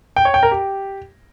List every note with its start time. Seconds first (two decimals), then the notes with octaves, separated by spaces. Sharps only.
0.16 G5
0.25 C#5
0.34 G5
0.43 A#4
0.51 G4